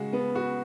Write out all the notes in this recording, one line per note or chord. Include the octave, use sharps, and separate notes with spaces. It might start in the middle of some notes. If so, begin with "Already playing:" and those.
Already playing: C#3 G#3 F#4
B3
F#4